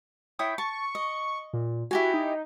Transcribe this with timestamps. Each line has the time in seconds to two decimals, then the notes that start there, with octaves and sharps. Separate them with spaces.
0.39 E4 C#5 G5 D#6
0.58 A5 C#6
0.95 D#5
1.53 A#2
1.91 E4 F#4 G4 G#5
2.14 D#4